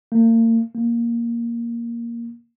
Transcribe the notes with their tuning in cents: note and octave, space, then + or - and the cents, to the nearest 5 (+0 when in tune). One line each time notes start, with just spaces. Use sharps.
A#3 -40
A#3 +5